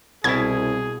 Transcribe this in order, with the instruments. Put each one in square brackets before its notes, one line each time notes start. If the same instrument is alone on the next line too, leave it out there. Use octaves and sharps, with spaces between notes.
[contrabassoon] C2 [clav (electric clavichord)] B2 E4 [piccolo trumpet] G#4 [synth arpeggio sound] G#6